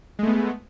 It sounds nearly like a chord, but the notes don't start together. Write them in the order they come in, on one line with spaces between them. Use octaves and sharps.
G#3 A3 B3